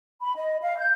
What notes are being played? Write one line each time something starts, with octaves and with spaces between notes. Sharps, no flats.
B5
D#5
F5
G6